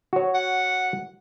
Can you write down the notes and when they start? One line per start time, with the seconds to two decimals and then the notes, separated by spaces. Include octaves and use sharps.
0.13 F#4 C#5
0.34 F#5